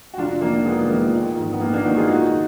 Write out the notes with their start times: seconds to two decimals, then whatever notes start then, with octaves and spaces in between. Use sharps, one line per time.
0.14 F#4
0.18 F1 D4 F4
0.41 F2 D#3 A#3 D4
0.65 F1 G#3 B3
0.89 F2 D#3 A#3
1.13 A#1
1.37 G#2 D#3
1.53 B3
1.60 A#1 A#3
1.73 A#3 D4
1.84 G#2 D#3 D#4 F#4
1.97 F4 G#4
2.08 F#1 D#4 F#4